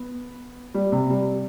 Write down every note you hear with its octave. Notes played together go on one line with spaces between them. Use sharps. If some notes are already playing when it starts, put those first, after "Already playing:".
Already playing: B3
G3
C3
G3